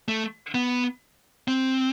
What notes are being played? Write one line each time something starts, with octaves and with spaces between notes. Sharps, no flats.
A3
B3
C4